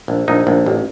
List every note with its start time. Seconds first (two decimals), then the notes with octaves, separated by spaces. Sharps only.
0.08 A#1
0.28 A#1 D#4
0.47 A#1
0.66 A1